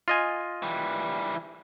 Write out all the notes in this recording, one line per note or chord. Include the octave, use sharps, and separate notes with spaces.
F4 D#5 G#5
E3 G3